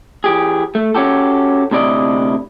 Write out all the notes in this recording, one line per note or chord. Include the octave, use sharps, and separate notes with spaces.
E3 G4 G#4
A3
C#4 F#4 G4 A4
D2 C3 E4 D5 D#5